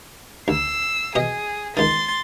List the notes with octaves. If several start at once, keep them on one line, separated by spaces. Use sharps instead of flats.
D2 E6 C7
B2 G#4 D#5
C#2 D#3 C6 A6